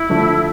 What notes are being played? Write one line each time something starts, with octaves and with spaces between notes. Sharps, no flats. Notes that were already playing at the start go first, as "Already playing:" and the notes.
Already playing: E4
D3 F3 A3 D4